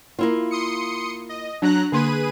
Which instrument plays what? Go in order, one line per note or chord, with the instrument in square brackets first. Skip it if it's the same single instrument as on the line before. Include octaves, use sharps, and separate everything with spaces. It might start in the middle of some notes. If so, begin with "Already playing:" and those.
[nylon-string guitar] A#3 E4 F4
[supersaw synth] C6 D#6 C#7
D#5
[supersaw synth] F#3 A#5 F#6 [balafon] D4
[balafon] D3 A#3 C6 [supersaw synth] G#4 B4 D#7